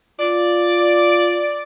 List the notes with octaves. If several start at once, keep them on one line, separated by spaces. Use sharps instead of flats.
F4 D5